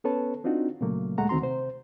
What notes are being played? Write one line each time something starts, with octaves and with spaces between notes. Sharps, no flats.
B3 C#4 A4 B4 C#5 A5
C4 D4 D#4 F4 F#4
A#2 C#3 F#3 A3 A#3
D2 A#2 G#3 A3 F#5 A#5
D2 D#3 C4 F#4 A#5 C6
C3 C5